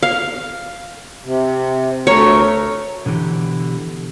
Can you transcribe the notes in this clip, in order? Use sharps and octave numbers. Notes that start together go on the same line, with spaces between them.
F5
C3
D2 A3 A#4 C#5
B2 D3 E3 G4